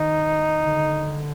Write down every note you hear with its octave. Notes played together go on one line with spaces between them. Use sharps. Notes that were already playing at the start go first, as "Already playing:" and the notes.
Already playing: D#3 D#4
D3